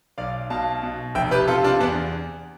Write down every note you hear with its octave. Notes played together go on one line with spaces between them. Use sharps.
B1 D5 F5
B2 F5 A5
B2
F1 E5 G5
G4 B4
C3 F4 A4
D4 F4
E2 B3 D4